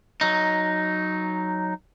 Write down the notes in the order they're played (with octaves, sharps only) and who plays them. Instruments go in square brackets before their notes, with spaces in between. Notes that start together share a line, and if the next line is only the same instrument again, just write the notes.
[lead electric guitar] F#3 D#4